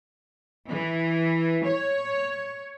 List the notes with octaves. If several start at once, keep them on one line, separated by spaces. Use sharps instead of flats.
E3
C#5